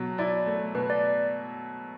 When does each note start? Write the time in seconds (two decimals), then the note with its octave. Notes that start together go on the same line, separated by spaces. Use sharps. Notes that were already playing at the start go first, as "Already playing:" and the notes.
Already playing: B2 F#3
0.18 E4 D5
0.46 A3
0.74 B2 B4
0.90 D5